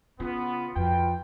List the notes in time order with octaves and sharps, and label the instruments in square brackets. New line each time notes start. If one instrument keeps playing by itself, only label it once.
[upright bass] C#3 [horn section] B3 [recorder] F4
[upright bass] F2 [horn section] F#4 B4 G5